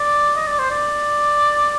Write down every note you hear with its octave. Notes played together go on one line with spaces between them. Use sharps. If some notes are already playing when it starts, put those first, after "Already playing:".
Already playing: D5
D#5
D5
C5
D5